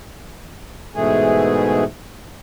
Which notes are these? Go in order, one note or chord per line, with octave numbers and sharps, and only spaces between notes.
G#2 B2 E3 A3 G#4